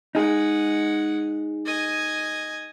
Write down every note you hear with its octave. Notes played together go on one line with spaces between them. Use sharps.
G#3 D#4 G#4 F#5
D#5 G#5